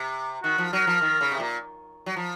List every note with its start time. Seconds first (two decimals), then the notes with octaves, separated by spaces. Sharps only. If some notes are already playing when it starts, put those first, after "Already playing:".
Already playing: C3
0.44 D#3 F#4
0.58 F3
0.73 F#3 A#4
0.87 F3
1.02 D#3
1.21 C#3
1.32 C3
1.40 A#2
2.06 F#3
2.16 F3